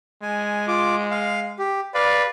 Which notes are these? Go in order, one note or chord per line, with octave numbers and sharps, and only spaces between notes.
G#3 G#5
F4 D6
F5
G4
B4 D5 F5